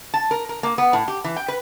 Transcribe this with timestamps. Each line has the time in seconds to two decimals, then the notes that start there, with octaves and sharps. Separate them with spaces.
0.14 A5
0.31 A#4
0.49 A#4
0.63 A#3
0.78 B3
0.93 A2
1.08 G4
1.24 E3
1.36 G5
1.48 B4